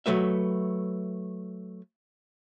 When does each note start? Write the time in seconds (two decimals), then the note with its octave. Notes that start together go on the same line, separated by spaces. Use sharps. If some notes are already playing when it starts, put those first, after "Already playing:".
0.06 F#3 A3 B4 E5